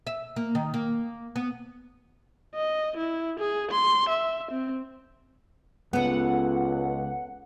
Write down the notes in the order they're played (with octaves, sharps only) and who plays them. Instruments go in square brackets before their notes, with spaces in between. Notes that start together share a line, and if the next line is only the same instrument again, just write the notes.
[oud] E5
A#3
D#3
A#3
B3
[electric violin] D#5
E4
G#4
C6
E5
C4
[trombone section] C#2 [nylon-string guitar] B3 A4 [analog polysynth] F#5